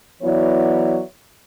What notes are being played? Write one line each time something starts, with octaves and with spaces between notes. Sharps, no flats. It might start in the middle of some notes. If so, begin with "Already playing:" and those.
E3 F#3 B3 E4 C#5 D5